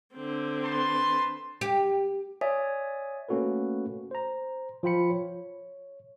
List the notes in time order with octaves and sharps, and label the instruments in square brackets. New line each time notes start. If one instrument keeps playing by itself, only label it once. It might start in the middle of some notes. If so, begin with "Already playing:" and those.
[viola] D3 C4
[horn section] B4 A5 C6
[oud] G4
[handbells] C#5 D5 E5 G#5 D#6
[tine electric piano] A3 A#3 C#4 F#4 A4 B4
C5 A#5
F3 F4 G5 B5 C#7
C#5